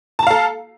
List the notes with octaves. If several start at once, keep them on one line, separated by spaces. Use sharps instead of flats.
A4 F5 A5 A#5